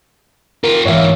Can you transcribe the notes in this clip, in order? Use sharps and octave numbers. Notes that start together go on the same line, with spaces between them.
F4 G4 A#4
G#2 E3 C#5 E5 F5